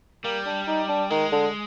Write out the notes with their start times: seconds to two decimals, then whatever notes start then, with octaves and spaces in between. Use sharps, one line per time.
0.24 G3 A#3
0.46 D4
0.67 D#4
0.89 D4
1.10 D#3 G#3
1.32 D3